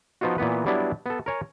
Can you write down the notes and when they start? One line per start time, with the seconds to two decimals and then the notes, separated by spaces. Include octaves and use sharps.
0.21 F3 B3 D#4 F4 F#4
0.38 A#2 E3 B3 B4
0.66 F#3 G3 B3 D4 E4
1.06 B3 A4
1.26 A#4 C#5 G#5